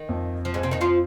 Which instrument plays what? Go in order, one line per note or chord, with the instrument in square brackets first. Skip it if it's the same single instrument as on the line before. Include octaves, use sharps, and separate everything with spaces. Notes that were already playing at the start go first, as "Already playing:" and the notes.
Already playing: [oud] D#3
[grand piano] F2
[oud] F3
G#2 G#3
C3 C4
D#3 D#4
F3 F4